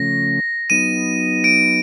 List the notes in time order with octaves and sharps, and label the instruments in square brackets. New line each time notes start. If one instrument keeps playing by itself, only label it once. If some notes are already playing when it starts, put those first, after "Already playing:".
Already playing: [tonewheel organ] C#3 F3 A3 C#4 [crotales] A#6
[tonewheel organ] F#3 B3 D#4 [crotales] D#7
[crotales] D7